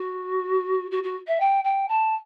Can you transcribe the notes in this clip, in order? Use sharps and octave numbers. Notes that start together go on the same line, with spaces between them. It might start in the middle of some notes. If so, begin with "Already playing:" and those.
Already playing: F#4
F#4
F#4
E5
G5
G5
A5